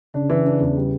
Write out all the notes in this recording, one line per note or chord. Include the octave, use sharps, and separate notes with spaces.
C#3 D4
E3
D4
E2
G3